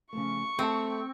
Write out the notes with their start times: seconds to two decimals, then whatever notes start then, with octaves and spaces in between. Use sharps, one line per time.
0.13 C#3 F3 A3 C#6
0.59 A3 C4 D#5 A5